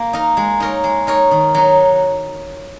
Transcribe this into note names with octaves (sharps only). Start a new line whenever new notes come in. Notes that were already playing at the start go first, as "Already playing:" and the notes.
Already playing: A#3
D#4 A#4
G#3
D#4 A#4 C#5
G#3
D#4 A#4 C#5
D#3
F#3 D#4